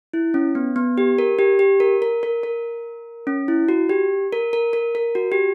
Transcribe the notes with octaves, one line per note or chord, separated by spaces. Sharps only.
E4
C#4
B3
B3
G4
A#4
G4
G4
A#4
A#4
A#4
A#4
C#4
E4
F#4
G4
A#4
A#4
A#4
A#4
F#4
G4